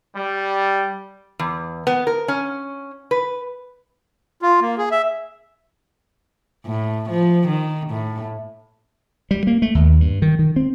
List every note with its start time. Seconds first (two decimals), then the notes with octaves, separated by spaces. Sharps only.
0.15 G3
1.39 E2
1.87 B3
2.07 A#4
2.28 C#4
3.11 B4
4.42 F4
4.61 A#3
4.78 G#4
4.91 E5
6.66 A2
7.10 F3
7.48 D#3
7.91 A2
9.31 G3
9.47 A#3
9.62 A3
9.75 D#2
10.00 G2
10.22 D#3
10.39 D#3
10.56 C4